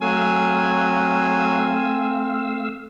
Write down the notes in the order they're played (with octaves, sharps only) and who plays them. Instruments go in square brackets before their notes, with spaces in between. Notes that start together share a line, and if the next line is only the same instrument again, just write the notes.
[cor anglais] F#3 [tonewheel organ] A3 F5 E6 [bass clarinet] C4 [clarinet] G#5